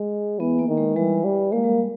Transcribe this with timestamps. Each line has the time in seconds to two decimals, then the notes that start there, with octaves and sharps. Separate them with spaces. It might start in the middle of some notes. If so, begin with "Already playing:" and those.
Already playing: G#3
0.39 E3 B3
0.59 A#3
0.68 D#3
0.78 G#3
0.96 E3 G3
1.25 G3
1.52 G#3 A#3
1.64 G3